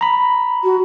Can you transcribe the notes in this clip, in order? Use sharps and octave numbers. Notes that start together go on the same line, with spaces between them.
A#5 B5
F#4